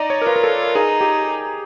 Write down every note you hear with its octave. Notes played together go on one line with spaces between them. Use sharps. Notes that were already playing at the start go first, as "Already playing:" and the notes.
Already playing: D#4 D5 D#5
C#5
A#4
F4 B4
A#4
A4
D#4 G#4
G4